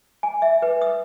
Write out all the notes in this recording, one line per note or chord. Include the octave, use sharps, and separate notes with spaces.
G#5
E5
B4
D#6